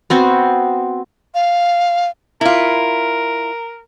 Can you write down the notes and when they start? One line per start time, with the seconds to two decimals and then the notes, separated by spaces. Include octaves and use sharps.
0.10 B3 C4 F#4
1.35 F5
2.41 E4 F4 A#4